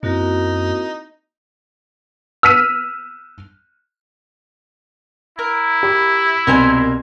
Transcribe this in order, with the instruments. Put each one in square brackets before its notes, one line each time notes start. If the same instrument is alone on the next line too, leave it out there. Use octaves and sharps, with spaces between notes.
[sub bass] F#2 [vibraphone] A#3 F#4 A#4 [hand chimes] C4 E4 A#6 [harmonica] D#4
[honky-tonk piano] E6 F6 B6 D#7
[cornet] E4 [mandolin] A#4
[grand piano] G4 B5
[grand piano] C2 B2 [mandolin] A#4 C5 G#5